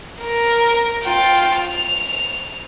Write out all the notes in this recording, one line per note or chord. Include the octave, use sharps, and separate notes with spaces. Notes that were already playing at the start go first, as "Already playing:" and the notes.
A#4
F4 G5
F7